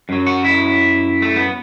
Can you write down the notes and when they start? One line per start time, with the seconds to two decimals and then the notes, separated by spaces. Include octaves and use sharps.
0.09 F#2 F#3
0.26 F#4
0.45 E4
1.22 A3
1.36 B3